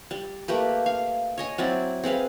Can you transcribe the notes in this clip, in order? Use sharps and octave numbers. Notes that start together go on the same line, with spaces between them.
G3
A3 A#3 G4 B4
F5
C#5 D#5 G#5
F#3 C4 E4 D5
C4 G#4 B4 F5